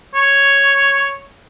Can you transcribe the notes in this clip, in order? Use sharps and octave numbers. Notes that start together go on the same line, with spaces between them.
C#5